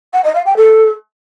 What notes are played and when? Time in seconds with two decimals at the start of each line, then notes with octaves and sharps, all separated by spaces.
0.13 F#5
0.24 D#5
0.35 F5
0.46 G5
0.56 A4